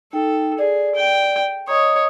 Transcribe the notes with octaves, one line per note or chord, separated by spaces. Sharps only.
D#4 A4 G5
G#4 D5
G5
C#5 D#5 A#5 D#6